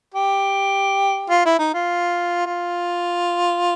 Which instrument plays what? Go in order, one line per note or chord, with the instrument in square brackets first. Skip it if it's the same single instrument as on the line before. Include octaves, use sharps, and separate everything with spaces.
[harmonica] G4
F4
E4
D#4
F4
F4